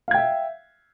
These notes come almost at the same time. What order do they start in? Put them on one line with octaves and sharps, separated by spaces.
F5 G#6 G5 E5